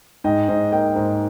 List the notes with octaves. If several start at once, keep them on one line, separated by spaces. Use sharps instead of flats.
G#2 D#5 G5
G#2 C5 D#5
A#3 D#5 G5
G#2 C5 D#5